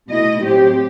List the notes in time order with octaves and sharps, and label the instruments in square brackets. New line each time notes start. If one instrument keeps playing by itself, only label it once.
[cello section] B2 A3 E4 D#5
A2 F#3 C4 G4